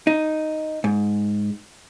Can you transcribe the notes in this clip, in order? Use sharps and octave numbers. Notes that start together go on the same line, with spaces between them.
D#4
G#2